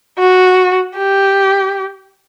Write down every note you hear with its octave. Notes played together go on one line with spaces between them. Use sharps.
F#4
G4